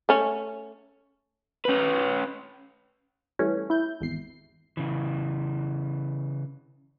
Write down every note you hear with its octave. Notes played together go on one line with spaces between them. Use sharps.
A3 C#4
C#4 B4
E3 G3 A3 C#4
E4 G6
G#1 E2 C7
C#3 E3